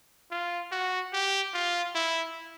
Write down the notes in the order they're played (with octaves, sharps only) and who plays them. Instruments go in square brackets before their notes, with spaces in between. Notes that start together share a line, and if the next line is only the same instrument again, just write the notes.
[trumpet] F4
F#4
G4
F4
E4